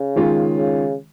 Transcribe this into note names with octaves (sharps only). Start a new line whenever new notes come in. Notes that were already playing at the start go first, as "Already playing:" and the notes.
Already playing: C#3
D#3 G#3 C#4 F4
C#3